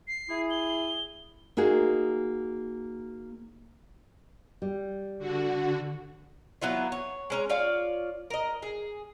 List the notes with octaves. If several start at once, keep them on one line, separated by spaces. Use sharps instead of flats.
C7
E4 G#4
G7
A#3 D#4 F#4 G#4
G3
D3 F#4
F#3 B3 E4 F4
C#5
G#3 C#4 A#5
F4 C#5 D5 F5
A#4 D#5
G#4